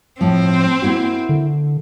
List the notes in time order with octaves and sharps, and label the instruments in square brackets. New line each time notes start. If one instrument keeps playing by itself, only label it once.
[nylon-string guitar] A2 F3 [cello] C4
[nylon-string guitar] A#3 E4 F#4
[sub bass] D3